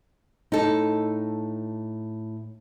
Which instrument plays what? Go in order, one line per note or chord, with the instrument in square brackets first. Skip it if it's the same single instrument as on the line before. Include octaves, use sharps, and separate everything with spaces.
[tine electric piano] A2 [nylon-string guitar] D#4 A4